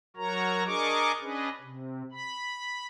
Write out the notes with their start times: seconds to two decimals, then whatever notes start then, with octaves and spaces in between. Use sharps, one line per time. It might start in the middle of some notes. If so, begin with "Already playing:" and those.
0.17 F#3 F#4 A#4 C#5 A#5
0.65 D4 G#4 A#4 D#5 C#6 D6
1.20 C#4 D4 G#4 B4 D#5
1.60 C3
2.12 B5